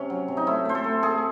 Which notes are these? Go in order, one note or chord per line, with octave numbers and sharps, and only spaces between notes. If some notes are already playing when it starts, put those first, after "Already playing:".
Already playing: C3 C#4
F#3
C3
D#4
A3 E4
A3 C5
A4
A3
A3 G#4